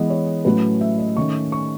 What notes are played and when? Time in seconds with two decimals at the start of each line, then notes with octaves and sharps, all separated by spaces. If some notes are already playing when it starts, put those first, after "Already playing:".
Already playing: E3 G#3 B3 D#5
0.10 C#5
0.45 A2 F#3 A3 C#4 B4
0.81 E5
0.99 D#5
1.17 D#3 A3 C#4 C#6
1.52 C#6